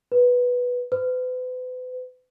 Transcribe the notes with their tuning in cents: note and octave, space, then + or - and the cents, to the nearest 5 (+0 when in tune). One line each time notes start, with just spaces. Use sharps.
B4 -5
B4 +40